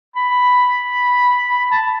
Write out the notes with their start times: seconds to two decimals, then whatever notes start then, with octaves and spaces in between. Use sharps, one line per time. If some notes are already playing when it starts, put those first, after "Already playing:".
0.16 B5
1.71 A5